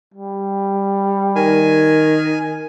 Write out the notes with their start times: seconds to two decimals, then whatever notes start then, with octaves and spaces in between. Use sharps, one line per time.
0.14 G3
1.36 D#3 G#5